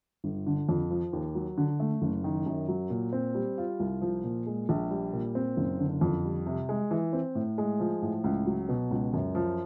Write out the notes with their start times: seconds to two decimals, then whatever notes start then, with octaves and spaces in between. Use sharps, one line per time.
0.24 G1
0.47 D3
0.69 F2
0.90 F3
1.13 D#2
1.35 F#3
1.58 D3
1.80 A3
2.02 F#1
2.24 D#3
2.46 F#2
2.68 F#3
2.90 A#2
3.13 C4
3.35 G3
3.58 F4
3.80 C2
4.01 F3
4.24 A#2
4.47 G#3
4.69 A#1
4.91 G3
5.13 A#2
5.35 C4
5.57 F#1
5.79 D3
6.01 F2
6.25 G3
6.46 C3
6.69 G#3
6.91 E3
7.13 C4
7.35 A2
7.58 G#3
7.80 F3
8.02 A2
8.24 C#2
8.46 F#3
8.69 B2
8.91 C#2
9.14 F#2
9.35 F3